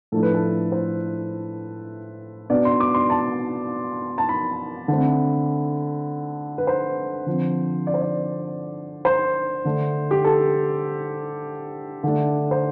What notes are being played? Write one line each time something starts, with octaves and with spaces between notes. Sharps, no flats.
A2 F3 A3 D4 A4
B4
A4
C5
B2 B3 D4 D5
C6
D6
C6
A5
A5
B5
D3 A3 C4
B4
C5
D3 F3 C4
D5
C5
D5
C5
D3 A3 D4
G4
A4
D3 A3 D4
C5